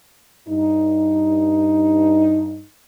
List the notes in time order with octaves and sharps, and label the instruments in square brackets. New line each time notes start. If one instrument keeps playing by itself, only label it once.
[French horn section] G2 D#4